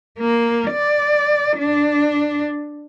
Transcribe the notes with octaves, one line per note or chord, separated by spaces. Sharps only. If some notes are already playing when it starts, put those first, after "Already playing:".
A#3
D5
D4